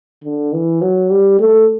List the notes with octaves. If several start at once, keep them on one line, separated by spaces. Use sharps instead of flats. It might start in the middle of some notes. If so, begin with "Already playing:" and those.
D3
E3
F#3
G3
A3